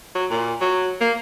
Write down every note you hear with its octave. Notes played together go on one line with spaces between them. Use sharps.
F#3
A#2
F#3
A#3